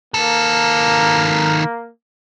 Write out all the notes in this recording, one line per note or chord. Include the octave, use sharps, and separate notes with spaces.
D#3 A#3 A4